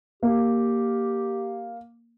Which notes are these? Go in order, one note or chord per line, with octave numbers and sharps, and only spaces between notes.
A#3 G4